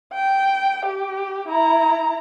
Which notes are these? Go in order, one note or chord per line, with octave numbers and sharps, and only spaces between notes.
G5
G4
E4 A#5